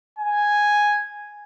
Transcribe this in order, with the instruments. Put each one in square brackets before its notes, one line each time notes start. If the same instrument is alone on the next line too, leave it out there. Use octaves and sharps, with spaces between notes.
[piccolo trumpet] G#5